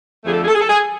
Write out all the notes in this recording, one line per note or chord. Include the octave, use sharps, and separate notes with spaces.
F2 D3 F3 A3 G#4
A4
G#4
A4
G#4
A4
G#4